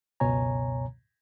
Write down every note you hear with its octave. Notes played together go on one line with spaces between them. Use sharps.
C#2 F#2 B2 C#5 G#5 A#5